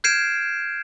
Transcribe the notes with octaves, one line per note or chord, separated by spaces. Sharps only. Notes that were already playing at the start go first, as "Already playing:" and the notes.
F6 G6 G#6 C7 D7 E7